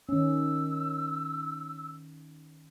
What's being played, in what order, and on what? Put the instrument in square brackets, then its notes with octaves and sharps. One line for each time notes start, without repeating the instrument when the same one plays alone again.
[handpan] D#3 C#4 [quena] E6